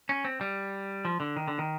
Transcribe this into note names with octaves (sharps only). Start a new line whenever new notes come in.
C#4
C4
G3
F3
D3
D#3
D3
D#3